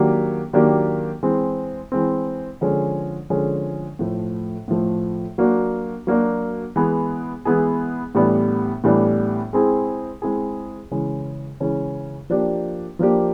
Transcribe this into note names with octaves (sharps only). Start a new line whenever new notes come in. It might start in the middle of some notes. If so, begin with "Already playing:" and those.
Already playing: D#3 F#3 A#3 D4 G4
D#3 F#3 A#3 D4 G4
E3 G#3 C4
E3 G#3 C4
D3 F3 G#3 C#4
D3 F3 G#3 C#4
A2 F3 A3
A2 F3 A3
F#3 A#3 D4 F#4
F#3 A#3 D4 F#4
E3 G#3 B3 E4 G#4
E3 G#3 B3 E4 G#4
A2 E3 G3 B3 D4
A2 E3 G3 B3 D4
G#3 C4 E4 G#4
G#3 C4 E4 G#4
C#3 E3 G#3 C#4
C#3 E3 G#3 C#4
F3 A#3 D4 G4
F3 A#3 D4 G4